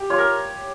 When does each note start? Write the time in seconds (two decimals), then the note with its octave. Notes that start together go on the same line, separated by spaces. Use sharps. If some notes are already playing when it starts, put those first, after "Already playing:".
Already playing: G4
0.10 F4 C#5
0.18 A#4